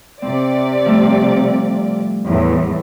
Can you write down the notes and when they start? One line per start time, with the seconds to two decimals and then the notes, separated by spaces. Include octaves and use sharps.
0.22 C3 C4 D5
0.86 F3 G3 A3
2.27 E2 A2